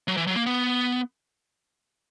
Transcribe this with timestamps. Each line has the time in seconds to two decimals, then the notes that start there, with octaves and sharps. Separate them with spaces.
0.08 F#3
0.17 E3
0.27 F#3
0.36 A#3
0.46 B3